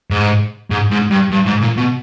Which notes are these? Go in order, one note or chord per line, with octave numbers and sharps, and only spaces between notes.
G#2
G#2
G#2
G2
G2
G#2
A#2
B2